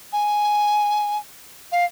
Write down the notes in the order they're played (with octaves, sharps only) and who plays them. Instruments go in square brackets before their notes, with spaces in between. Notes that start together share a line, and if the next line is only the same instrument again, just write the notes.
[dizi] G#5
F5